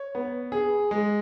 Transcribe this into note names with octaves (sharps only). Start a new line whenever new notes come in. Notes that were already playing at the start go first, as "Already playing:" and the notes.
Already playing: C#5
B3
G#4
G#3